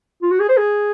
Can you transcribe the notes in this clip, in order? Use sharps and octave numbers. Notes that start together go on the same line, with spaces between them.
F4
F#4
G#4
C5
G#4